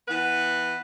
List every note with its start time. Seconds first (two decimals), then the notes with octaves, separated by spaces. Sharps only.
0.08 E3 B3 B4